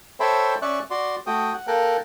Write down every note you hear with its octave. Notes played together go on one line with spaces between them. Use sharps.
A4 C5 C#5 E5 G5 B5
C#4 D5 E5 C#6 F#6
F#4 D5 C6
A3 F#4 G5 D#6
F#5
A#3 A4 A#4 G5 F#6